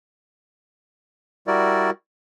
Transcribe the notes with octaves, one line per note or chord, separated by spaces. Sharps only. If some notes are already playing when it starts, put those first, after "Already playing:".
G3 E4 F#4 A#4 D5